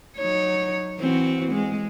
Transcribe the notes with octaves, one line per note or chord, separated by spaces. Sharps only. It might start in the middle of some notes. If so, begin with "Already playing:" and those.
F#3 D#4 C#5
E3 C4 F#4
G#3